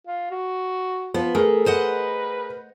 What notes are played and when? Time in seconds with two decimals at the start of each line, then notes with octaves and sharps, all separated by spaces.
0.07 F4
0.31 F#4
1.14 F3 B3
1.35 A3 G#4 A#4
1.66 B4 C5 D#5 F#5